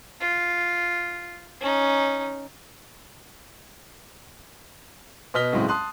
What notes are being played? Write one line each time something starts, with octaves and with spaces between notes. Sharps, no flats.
F4
C#4 D#4
B2 B3 D#5 F6 B6 G7
C#2 A2 F#3 G#3 C4
A5 C6 D#6 F#6